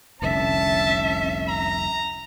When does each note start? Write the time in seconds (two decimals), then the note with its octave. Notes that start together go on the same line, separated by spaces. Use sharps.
0.22 F1 C2 D3 C#4 E5 A5
1.48 A#5